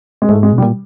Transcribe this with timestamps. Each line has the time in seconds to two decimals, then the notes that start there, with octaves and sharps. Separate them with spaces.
0.22 G#3
0.29 G#2 A3
0.43 G#3
0.53 B2
0.58 G3
0.63 A#2